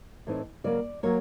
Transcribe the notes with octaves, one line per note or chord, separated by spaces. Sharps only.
A2 E3 A3 C4 D#4
C#3 F#3 A#3 D5
F#3 A#3 C#5